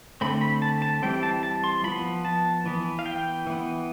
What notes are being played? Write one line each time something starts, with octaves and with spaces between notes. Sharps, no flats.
D3 A3 C4 B5
B5
A5
A5
E3 G3 C4 G5
A5
A5
C6
F3 B3 B5
A5
E3 B3
F5
G5
E3 B3